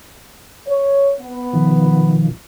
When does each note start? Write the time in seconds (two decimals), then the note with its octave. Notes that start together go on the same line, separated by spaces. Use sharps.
0.67 C#5
1.20 B3
1.53 B2 D#3 F3